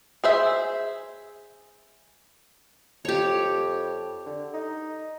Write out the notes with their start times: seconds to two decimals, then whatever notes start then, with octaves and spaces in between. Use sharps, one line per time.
0.24 G#4 C5 E5
3.05 F2 G4 C#5
4.26 D3
4.54 D#4